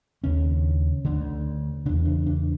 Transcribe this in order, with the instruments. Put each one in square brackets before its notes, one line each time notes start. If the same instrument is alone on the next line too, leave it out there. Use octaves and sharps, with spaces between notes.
[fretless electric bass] D#2 C#3 C#4
D2 D3
E2 C#3 D4
D4
D4